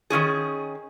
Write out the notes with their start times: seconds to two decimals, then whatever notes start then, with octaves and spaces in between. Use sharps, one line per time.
0.10 D#3 F3 C#4 G#4